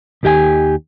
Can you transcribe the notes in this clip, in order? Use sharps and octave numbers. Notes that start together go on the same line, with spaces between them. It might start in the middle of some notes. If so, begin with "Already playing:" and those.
D#2 D#3 G4 D5 G#5